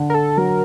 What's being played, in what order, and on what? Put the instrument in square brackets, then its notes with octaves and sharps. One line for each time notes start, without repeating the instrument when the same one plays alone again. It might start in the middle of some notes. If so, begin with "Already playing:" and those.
Already playing: [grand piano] D3
[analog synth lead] A#4
A4
[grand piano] F#3 [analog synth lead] A#4